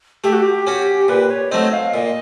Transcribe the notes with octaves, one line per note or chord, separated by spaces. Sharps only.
A3 G4
F#4
G4
C#4 F#4
A#2 B4
C#5
F#3 A3 C4 D#4 D#5
F5
A#2 D#5